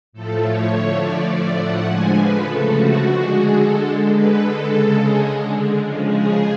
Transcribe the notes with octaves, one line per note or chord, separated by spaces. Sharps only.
A2 F3 A3 A4
C#5
D3 F3 A3
D5
A2 F3 A3 D5
F#5
D3 F3 G#3 G#5
B4
C#3 F3 A3 A4
F#4
D3 G#3
G#4
D3 G#3 A4
D3 G#3 B4
A4
C#3 G#3
G#4
D3 G#3
C#3 F3 G#3
G#4